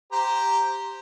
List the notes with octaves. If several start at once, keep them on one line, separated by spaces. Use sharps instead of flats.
G4 C5 A#5